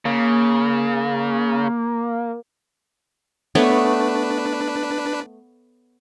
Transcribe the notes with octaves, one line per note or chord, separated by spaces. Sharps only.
C#3 A#3
A3 B3 D4 B4 C#5